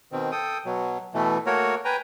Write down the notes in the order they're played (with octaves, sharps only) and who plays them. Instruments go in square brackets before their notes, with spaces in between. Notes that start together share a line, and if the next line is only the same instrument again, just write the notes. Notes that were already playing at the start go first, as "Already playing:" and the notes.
[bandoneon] B2 D#3 C4
A4 G5 D#6
B2 F#3
B2 E3 A3
A3 A#3 F#4 A#4 C#5
B4 G5 G#5 A#5